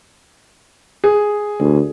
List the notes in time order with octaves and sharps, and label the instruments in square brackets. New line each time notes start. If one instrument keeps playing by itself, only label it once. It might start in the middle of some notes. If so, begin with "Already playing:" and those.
[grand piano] G#4
[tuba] D2